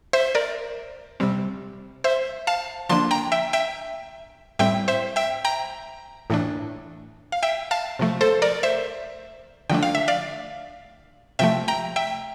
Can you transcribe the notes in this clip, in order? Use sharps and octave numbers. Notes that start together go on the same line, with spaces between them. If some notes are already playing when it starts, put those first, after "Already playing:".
C5 E5
A#4 D5
C3 G3 C4
C5 E5
F5 A5
D3 F3 A#3 D4 A5 C6
G5 A#5
E5 G5
E5 G5
A2 G3 C4 E5 G5
C5 E5
E5 G5
G5 A#5
A2 E3 A3 D4
F5
E5 G5
F5 A5
C3 F3 A3
A4 C5
A#4 D5
C5 E5
D3 F3 A3 D4 G5
F5
E5
D5 F5
C3 F3 A3 E5 G5
G5 A#5
E5 G5